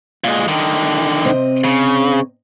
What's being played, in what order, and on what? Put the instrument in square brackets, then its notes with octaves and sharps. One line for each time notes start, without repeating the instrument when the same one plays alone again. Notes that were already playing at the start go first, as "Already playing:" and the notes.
[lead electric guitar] A#2 G#3
D3 D#3
[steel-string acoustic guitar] C3 C4 D#5
[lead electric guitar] C#3